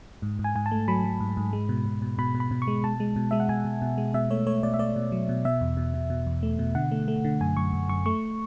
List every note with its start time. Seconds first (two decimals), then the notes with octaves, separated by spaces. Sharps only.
0.22 G#2
0.39 G#2
0.44 G#5
0.55 G#2 G#5
0.66 A5
0.71 A3
0.88 F#3 B5
1.04 F#3
1.20 G#2
1.37 G#2
1.53 G#3
1.69 B2
1.86 B2
2.02 B2
2.18 B2 B5
2.35 B2
2.40 B5
2.51 B2
2.62 C#6
2.67 G#3
2.83 B2 A5
3.00 G#3
3.16 B2
3.31 G#3 E5
3.40 F#5
3.49 B2 G#5
3.65 B2
3.82 B2
3.98 G#3
4.14 B2 E5
4.30 A3 C#5
4.47 A3 C#5
4.63 B2 D5
4.74 E5
4.79 A3 D5
4.96 B2
5.12 F#3
5.29 B2
5.45 B2 E5
5.61 E2
5.77 B2
5.94 B2
6.10 B2
6.26 E2
6.43 A3
6.59 B2
6.75 D3 F#5
6.91 A3
7.08 A3
7.24 D3
7.41 F#2 G#5
7.57 F#2 C#6
7.73 F#2
7.89 F#2 C#6
8.06 A3 C#6